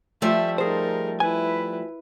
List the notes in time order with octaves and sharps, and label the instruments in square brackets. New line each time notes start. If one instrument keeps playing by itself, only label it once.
[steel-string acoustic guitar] F3 G3 A3 [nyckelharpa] E5
[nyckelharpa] D#4 A#4 [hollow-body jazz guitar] G#4 C5
[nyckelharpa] E4 B4 [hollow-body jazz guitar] G#5